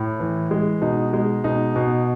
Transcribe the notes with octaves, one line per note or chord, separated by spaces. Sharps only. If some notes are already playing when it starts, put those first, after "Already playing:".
Already playing: A2
E3
G#3
B2 D#4
G#3
B2 D#4
B2